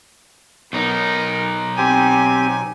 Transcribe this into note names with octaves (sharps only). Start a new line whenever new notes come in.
B1 B3 D#4 A#4
C4 G4 G#5